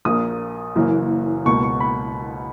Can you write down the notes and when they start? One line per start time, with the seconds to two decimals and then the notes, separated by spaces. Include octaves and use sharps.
0.05 A#1 A#2 A#3 D#6
0.75 F#1 F#2 E3 A#3
1.46 C#2 B2 A#3 C#6
1.63 C#6
1.80 B5